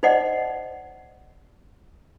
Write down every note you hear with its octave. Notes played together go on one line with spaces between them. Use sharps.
D#4 C5 D5 D#5 F#5